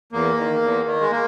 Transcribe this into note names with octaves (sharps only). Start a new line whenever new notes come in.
E2 A#3
D#3
E2
D#3
G#3
A#3